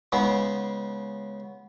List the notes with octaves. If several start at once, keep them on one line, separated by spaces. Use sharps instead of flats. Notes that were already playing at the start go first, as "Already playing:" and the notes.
C#3 G#3 B3 D#4